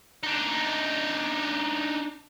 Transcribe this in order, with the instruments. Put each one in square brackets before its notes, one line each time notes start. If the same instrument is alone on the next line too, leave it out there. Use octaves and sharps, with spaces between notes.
[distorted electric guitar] D4 D#4